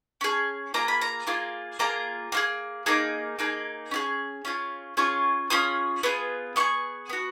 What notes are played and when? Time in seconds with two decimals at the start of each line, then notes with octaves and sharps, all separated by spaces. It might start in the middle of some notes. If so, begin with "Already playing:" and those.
0.21 C#4 G#4
0.74 A#3 F4 G#4 A#5
0.88 B5
1.01 A#5
1.27 A#3 F4 G#4
1.79 A#3 F4 G#4 A#5
2.32 A#3 F4 G#4
2.86 A#3 D#4 G#4
3.39 A#3 D#4 G#4
3.91 C#4 F4 G#4
4.45 C#4 F4 G#4
4.97 C#4 F4 G#4 C#6
5.50 C#4 F4 G#4 D#6
6.03 B3 F4 G#4
6.56 B3 F4 G#4 C#6
7.09 B3 F#4